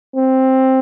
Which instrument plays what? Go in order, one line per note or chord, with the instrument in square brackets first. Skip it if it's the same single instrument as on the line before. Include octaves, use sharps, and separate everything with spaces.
[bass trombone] C4